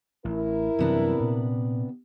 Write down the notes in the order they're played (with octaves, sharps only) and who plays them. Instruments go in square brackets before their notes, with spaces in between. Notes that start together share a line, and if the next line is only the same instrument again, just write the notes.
[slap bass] A1 [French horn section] E4 A#4
[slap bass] F#2 E3 G3 [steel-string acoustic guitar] C3 B3 D4
[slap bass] A#2